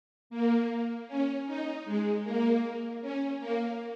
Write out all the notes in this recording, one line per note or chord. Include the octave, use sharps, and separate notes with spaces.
A#3
C#4
D#4
G#3
A#3
C#4
A#3